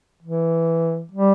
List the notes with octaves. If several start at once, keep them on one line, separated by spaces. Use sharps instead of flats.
E3
G3